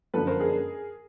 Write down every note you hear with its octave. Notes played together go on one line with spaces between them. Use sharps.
F#2 D3 F3 A4 B4
A#4 C5
G#4 A#4